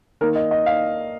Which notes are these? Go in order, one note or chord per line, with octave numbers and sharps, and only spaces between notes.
D#3 A#3 A#4
D#5
D#5
F5